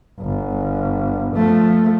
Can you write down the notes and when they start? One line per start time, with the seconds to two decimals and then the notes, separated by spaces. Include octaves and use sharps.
0.20 G1
1.35 F3 A3